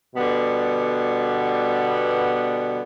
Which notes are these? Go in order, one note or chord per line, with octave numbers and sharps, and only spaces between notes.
B2 D3 G3 B3